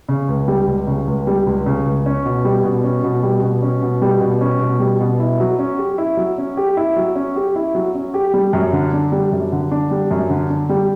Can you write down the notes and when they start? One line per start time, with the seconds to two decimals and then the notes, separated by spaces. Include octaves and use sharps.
0.09 C#3
0.29 C#2
0.48 G3
0.67 C#2
0.87 C#3
1.08 C#2
1.27 G3
1.47 C#2
1.66 C#3
1.86 C#2
2.06 C#4
2.26 B2
2.45 G3
2.64 B2
2.83 C#4
3.03 B2
3.23 G3
3.42 B2
3.62 C#4
3.82 B2
4.02 G3
4.21 B2
4.41 C#4
4.61 B2
4.80 G3
5.00 B2
5.20 E4
5.40 F#3
5.59 C#4
5.78 G4
5.98 E4
6.17 F#3
6.38 C#4
6.57 G4
6.77 E4
6.96 F#3
7.15 C#4
7.36 G4
7.56 E4
7.75 F#3
7.95 C#4
8.14 G4
8.34 G3
8.53 F#2
8.73 D3
8.93 D4
9.12 G3
9.32 F#2
9.52 D3
9.71 D4
9.91 G3
10.11 F#2
10.30 D3
10.50 D4
10.69 G3